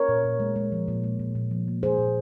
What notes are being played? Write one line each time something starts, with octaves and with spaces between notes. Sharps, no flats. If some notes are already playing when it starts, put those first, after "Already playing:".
Already playing: A#4 C#5
A#2
A#2
G#3
G#3
F3
A#2
G#3
A#2
A#2
F3
A#3
F3 G#4 C5
A#2